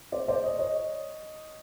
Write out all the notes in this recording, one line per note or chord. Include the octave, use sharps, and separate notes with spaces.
C5 D5
C5 D5
C#5 D#5
C#5 D#5